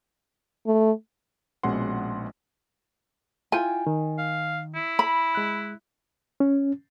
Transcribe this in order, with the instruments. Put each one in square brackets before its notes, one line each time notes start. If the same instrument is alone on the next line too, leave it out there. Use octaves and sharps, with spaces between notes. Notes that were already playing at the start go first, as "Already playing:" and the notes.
[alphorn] A3
[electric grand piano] A#1 B2 G#3 C#4 F#5 C6
[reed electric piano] E4 F4 G5 [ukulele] G#5
[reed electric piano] D#3
[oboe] F5
E4
[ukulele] B5
[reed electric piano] G#3 F#6
C#4